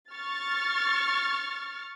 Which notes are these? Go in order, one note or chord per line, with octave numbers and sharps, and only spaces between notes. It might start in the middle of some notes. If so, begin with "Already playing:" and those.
C#6 F6 A6